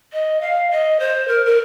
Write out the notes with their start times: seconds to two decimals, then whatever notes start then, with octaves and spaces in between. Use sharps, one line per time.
0.13 D#5
0.41 F5
0.71 D#5
0.99 C5
1.28 A#4
1.46 A#4